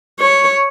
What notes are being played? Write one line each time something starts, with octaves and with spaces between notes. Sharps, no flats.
C#5